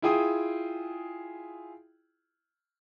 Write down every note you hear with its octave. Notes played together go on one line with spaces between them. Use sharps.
E4 F4 G#4 G5 D#6